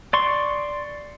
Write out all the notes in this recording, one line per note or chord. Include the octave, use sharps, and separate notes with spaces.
D5 C6 C#6